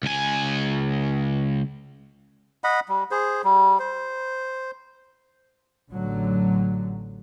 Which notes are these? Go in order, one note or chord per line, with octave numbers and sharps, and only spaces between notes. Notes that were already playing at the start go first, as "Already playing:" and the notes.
C#2 G#5
D#5 F#5 B5
G3
G#4 C5
G3
C5
A1 D3 F#3